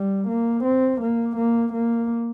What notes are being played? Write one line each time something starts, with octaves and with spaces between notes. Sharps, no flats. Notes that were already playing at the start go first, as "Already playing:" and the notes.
Already playing: G3
A#3
C4
A#3
A#3
A#3